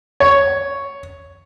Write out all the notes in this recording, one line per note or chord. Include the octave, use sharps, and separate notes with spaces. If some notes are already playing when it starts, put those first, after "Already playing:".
C#5